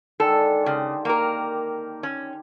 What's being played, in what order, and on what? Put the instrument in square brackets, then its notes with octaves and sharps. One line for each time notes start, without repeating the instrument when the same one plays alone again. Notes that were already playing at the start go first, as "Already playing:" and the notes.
[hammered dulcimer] D3 D#3 G#3 [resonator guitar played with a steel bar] A4
[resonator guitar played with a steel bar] C#3 [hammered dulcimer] G4 C5
[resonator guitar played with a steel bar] A#3 A#4
C#4